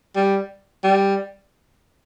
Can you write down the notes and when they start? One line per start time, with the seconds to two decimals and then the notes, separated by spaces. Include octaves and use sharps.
0.16 G3
0.84 G3